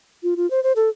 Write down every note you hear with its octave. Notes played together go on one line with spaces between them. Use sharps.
F4
F4
C5
C5
A4